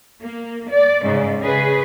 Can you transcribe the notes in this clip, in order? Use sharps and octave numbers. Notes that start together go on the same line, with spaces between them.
A#3
D5
G#2 C#3
C#3 G#4 B4